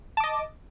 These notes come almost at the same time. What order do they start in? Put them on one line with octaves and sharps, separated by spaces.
A5 D6 D#5